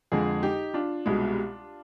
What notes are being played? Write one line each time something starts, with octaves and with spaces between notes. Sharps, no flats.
F2 D3 G#3 F4 G#4
D#4 G4
D4 F4
C2 B2 G#3